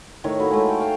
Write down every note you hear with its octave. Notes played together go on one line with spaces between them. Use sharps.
A2 D#3 C#5
A#3 D#4 E4 F#4
G#3 A3
F5 G5
F5 G5 A5